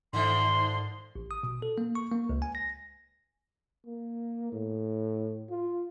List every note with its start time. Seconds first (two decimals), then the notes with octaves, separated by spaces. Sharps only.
0.13 G#2 D3 D#3 F3 C6
1.15 A1
1.31 D#6
1.43 B2
1.62 A4
1.78 A#3
1.95 C#6
2.11 A#3
2.29 C#2
2.42 G#5
2.55 A#6
3.86 A#3
4.53 A2
5.51 F4